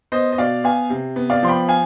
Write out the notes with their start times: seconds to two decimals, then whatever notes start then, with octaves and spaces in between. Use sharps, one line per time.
0.12 B3 C5 D#5
0.32 D#5
0.38 B2 D5 F5
0.64 B3 F5 G#5
0.90 C3
1.16 B3
1.30 D5 F5
1.43 F3 C6
1.48 G5 B5
1.68 F5 G#5